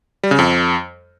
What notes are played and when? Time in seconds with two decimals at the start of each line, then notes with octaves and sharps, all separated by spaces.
0.23 G3
0.31 C#3
0.39 F2